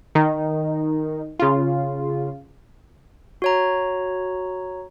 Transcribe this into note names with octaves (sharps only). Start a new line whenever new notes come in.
D#3 D#4
C#3 F4
F#4 C#5 A#5